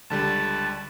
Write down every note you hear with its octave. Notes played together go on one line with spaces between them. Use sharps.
C#2 D3 G3 A5